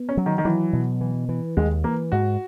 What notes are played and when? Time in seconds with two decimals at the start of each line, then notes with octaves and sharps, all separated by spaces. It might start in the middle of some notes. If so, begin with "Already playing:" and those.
Already playing: B3
0.09 C#4
0.17 F#3
0.26 D#3
0.38 D#3
0.45 E3 F#3
0.73 B2
1.01 E3
1.29 E3
1.57 D#2 G#3
1.84 E3 A#3
2.12 G#2 F#4